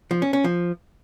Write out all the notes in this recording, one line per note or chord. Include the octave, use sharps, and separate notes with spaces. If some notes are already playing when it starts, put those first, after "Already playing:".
F3
C#4
C#4
F3